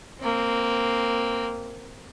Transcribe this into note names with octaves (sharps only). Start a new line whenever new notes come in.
A#3 C4